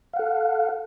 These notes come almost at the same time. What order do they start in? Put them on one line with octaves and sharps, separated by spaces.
F5 F#5 A4